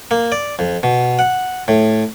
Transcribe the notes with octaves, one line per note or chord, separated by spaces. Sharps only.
A#3
D5
F2
B2
F#5
A2